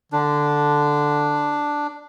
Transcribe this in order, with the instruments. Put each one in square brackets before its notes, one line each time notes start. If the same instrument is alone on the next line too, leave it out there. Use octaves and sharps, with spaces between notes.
[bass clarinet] D3 [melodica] D4